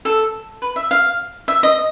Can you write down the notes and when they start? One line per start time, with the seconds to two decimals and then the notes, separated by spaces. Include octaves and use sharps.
0.05 A4
0.62 B4
0.76 E5
0.91 F5
1.48 E5
1.63 D#5